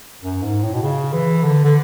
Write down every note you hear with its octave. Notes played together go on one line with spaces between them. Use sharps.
F#2
G#2
A2
B2
C#3
E3
D3
D3